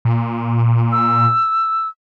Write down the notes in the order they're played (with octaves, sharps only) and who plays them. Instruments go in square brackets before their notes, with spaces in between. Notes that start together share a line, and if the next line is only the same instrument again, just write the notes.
[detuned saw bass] A#2
[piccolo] E6